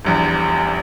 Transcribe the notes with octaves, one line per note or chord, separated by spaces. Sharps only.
D#1 A#1 E2